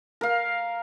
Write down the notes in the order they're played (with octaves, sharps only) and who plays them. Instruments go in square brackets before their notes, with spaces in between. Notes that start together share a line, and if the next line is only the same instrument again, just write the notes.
[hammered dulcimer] A#4 F5